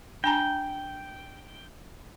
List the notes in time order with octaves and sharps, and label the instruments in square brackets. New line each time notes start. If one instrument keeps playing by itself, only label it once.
[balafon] D4 G#5 A#5 [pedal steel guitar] G5